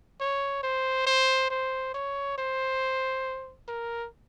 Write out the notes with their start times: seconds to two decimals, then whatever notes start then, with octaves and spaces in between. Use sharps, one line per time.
0.20 C#5
0.63 C5
1.07 C5
1.50 C5
1.94 C#5
2.38 C5
3.68 A#4